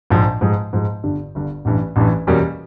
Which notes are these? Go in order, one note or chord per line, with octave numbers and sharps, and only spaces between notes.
A#1 G#2 F3
G#2 F3 G#3
G#2 F3 G#3
G1 G2 D3
G1 G2 D3
A1 G2 E3
A1 G2 E3
E2 B2 G3 A#3 C#4